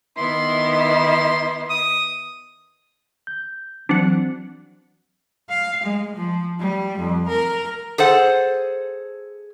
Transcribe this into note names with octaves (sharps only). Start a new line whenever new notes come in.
D#3 B3 E4 C6
C6
D#6
G6
E3 F#3 C4 D4 F#5
F5
G#3
F3
G3
F2
A#4
G#4 A4 C5 F#5